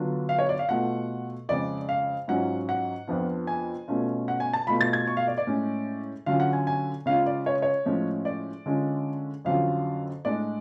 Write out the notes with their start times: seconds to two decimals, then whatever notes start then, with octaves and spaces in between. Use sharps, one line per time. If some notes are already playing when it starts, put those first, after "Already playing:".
Already playing: D3 F#3 B3 D4 F4
0.29 F5
0.39 C#5
0.49 D5
0.59 F5
0.69 B2 A3 F4 F#5
1.49 F2 C#3 G#3 D5
1.89 F5
2.28 G#2 F#3 C#4 F4 F#5
2.69 F#5
3.08 F2 F3 B3 D4 F4
3.47 G#5
3.88 B2 A3 C#4 F4
4.28 F#5
4.40 G#5
4.54 A5
4.67 B2 A3 F4 B5
4.81 A6
4.93 G#6
5.07 C#6
5.17 F5
5.27 D5
5.38 D5
5.47 A2 G#3 C#4
6.26 D3 F#3 C#4 F4 F5
6.40 F#5
6.53 G#5
6.67 G#5
7.06 C#3 G#3 C#4 F4 F5
7.26 D5
7.46 C#5
7.62 C#5
7.85 A2 F3 G#3 C#4
8.25 D5
8.66 D3 G#3 C#4 F4
9.45 F2 D3 F#3 C#4 F4 F5
10.25 A2 G#3 D4 D5